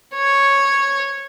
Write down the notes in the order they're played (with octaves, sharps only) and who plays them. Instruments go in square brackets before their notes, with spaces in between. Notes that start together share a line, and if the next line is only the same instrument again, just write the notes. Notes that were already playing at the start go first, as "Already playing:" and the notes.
[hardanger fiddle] C#5